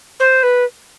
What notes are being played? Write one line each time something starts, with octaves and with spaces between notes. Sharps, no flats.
C5
B4